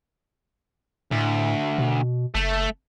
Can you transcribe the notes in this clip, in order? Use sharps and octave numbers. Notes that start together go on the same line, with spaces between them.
D2 A2
B2
F#1 A3